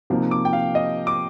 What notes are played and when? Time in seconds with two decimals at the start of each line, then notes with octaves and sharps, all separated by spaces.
0.10 C3 F3 A#3 D#4
0.31 D6
0.45 G5
0.53 F5
0.75 D#5
1.07 D6